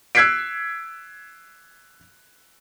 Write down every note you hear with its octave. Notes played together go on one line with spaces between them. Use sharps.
E6 F#6 G#6 B6 C7 D7